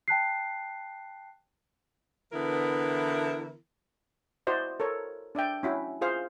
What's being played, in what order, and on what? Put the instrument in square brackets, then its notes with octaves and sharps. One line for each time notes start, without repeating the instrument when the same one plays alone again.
[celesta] G5 A5 F#6 C7
[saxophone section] D3 E3 B3 E4 A#4
[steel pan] E4 F#4 C5 D5 D#5
A4 A#4 C#5
D4 D5 E5 G5
C#4 E4 F#4
F4 G#4 C5 F5